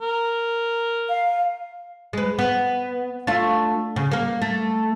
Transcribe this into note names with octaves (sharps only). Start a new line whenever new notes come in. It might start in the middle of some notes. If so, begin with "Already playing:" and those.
A#4
F5
G#3 B4
B3
A3 D4 F4
C#3
A#3 A#4
A3